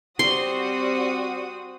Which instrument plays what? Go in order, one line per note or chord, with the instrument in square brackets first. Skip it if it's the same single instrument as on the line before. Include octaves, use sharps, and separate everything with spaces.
[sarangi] G3 [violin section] C4 F#4 D#6 [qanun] C6